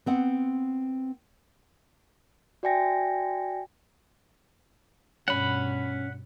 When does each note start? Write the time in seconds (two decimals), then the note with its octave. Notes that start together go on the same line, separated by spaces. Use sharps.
0.06 B3 C4 F#5
2.63 F#4 D5 E5 G5 G#5 A#6
5.28 G2 B2 C#4 F#5 B5